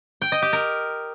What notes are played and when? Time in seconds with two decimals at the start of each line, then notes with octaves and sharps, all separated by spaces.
0.22 G5
0.32 D#5
0.42 G4
0.53 A#4